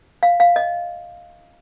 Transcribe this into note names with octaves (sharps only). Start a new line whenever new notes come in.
F5
F5
D#5